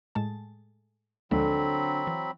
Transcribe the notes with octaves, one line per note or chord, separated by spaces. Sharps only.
A2 G#3 A5
D2 D3 F3 F#3 G#3 C4 B5
E3